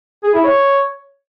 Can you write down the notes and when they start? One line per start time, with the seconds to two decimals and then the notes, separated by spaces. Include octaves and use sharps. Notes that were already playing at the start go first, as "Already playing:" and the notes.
0.23 G#4
0.34 E4
0.44 C#5